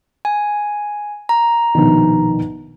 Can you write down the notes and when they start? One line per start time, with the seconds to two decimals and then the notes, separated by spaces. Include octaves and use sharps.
0.25 G#5
1.29 A#5
1.75 A#1 B2 D#3